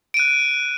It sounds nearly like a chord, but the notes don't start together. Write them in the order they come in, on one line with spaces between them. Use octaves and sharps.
D7 D#7 F#6